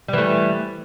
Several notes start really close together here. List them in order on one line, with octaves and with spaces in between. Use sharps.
G3 E3 A3